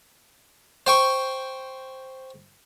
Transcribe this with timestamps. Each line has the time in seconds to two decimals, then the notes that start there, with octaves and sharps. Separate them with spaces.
0.87 C5 G5 C#6